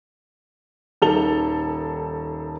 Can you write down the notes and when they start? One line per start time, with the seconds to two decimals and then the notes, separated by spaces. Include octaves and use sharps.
1.02 D#1 D#3 A4 A5 F7 G7